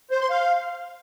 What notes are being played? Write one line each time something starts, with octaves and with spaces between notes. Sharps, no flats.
C5
C6
F5